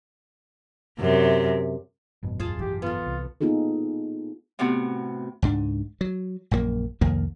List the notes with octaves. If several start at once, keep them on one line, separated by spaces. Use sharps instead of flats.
F#2 C3
G#1 F#2 B2
E2 F4 G#4 A5
E3 G4
B3 F4 A4
C2
A#3 B3 D#4 F4 G#4 A4
A2 C3 B3 C4 F#4
C#2 G#2 D4
F#3
A#1 F#2 C#3 A#3
C2 F2 D#3 A#3